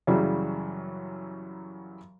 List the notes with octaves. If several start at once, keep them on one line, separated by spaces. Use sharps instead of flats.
F#2 C#3 E3 F#3 G3